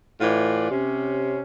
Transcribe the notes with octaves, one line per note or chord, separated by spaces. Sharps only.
A2 E3 F4 D5
C3 C#4